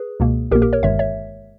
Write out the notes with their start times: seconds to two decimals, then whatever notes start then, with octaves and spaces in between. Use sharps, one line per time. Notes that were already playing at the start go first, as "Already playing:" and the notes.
Already playing: G#4 B4
0.20 C#2 B2 A#3
0.51 A#1 A#2 A#3 G4 A#4
0.62 G4 A#4
0.73 A#4 C#5
0.83 G1 G2 D#3 G#3 C#5 E5
0.99 C#5 E5